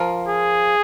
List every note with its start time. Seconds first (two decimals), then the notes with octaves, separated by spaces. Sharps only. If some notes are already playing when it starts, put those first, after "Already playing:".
Already playing: F3 F4 A#4
0.28 G#4